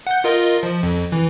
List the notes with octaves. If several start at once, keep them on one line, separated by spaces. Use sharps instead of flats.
F#5 G6
F4 A#4 D#5
F3
F2
E3